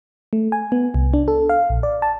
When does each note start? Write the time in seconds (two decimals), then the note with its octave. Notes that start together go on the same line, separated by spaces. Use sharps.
0.33 A3
0.52 G#5
0.72 B3
0.94 C2
1.14 D4
1.28 A4
1.49 F5
1.70 A#1
1.83 D5
2.02 A5